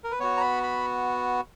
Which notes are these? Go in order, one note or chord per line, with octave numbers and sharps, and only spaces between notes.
A#4
B4
B3 F#4 C#5
A#5
B5
B5